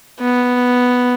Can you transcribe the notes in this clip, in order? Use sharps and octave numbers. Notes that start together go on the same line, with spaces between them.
B3